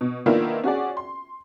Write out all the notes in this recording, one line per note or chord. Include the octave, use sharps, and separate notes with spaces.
B2
D#3 A#3 B3 D4 E4 F4
C#4 F#4 G#4 D5
C6